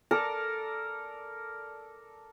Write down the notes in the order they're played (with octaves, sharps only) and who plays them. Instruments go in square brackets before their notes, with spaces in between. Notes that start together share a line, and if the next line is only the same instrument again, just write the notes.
[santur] A4 A#4 D5 A#5